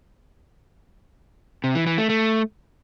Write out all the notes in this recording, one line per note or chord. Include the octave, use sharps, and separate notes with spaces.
C3
E3
E3
A3
A3